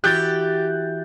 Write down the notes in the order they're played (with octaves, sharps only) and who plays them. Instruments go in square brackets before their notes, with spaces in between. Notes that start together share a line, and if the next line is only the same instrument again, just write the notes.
[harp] E3 F#4 E5 [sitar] G4 [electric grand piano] F#6 G6 A6